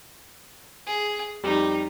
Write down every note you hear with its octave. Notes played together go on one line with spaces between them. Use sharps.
G#4
F2 G3 D#4 G4